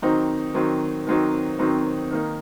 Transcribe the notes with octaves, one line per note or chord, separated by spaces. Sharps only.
D#3 F#3 C4 D#4
D#3 F#3 C4 D#4
D#3 F#3 C4 D#4
D#3 F#3 C4 D#4
D#3 A#3 D#4